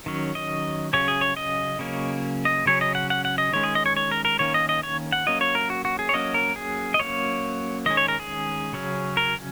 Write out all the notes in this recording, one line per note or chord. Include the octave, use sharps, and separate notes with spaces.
D#3 F#3 C#4
D#5
C#3 F#3 C#4 C#5
G#4
C#5
D#5
C#3 F#3 A#3 C#4
D#5
C#3 F#3 C#4 C#5
D#5
F#5
F#5
F#5
D#5
D#3 G#3 C#4 C#5
G#4
D#5
C#5
C#5
A#4
A#4
D#3 A#3 C#4 C#5
D#5
D#5
C#5
F#5
F#3 A#3 C#4 D#5
C#5
A#4
F#4
F#4
G#4
C#5
F#3 A#3 C#4 D#5
A#4
G#4
D#5
F#3 A#3 C#4 C#5
D#3 G#3 C#4 D#5
C#5
A#4
G#4
C#3 F#3 C#4
A#4